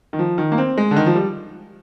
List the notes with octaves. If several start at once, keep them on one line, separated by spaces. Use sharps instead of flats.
D#3
F3
D#3
A#3
C4
G#3
D3
D#3
F3
G3